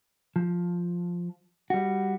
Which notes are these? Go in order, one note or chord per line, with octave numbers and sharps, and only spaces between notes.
F3
G3 F#4